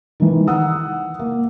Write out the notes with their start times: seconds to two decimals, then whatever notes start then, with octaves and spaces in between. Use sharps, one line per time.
0.20 D#3 E3
0.47 F#5 D#6 E6
1.19 A#3